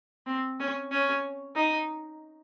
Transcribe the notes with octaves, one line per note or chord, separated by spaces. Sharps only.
C4
C#4
C#4
D#4